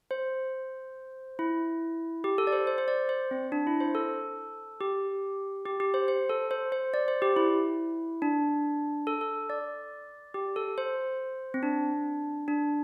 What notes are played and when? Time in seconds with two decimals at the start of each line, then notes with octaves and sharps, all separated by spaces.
0.11 C5
1.39 E4
2.24 G4
2.38 A4
2.47 D5
2.52 C5
2.67 C5
2.78 C5
2.88 D5
3.09 C5
3.31 C4
3.52 D4
3.67 E4
3.80 C5
3.95 A4
4.81 G4
5.66 G4
5.80 G4
5.94 C5
6.08 C5
6.30 A4
6.51 C5
6.72 C5
6.94 D5
7.08 C5
7.22 G4
7.37 E4
8.22 D4
9.07 A4
9.21 A4
9.50 D5
10.34 G4
10.56 A4
10.78 C5
11.54 C4
11.63 D4
12.48 D4